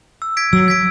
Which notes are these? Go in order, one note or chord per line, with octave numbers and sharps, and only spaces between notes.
E6
G#6 B6 D7
F#3 E6
G#6 B6 D7